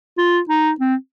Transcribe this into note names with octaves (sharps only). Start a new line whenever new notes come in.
F4
D#4
C4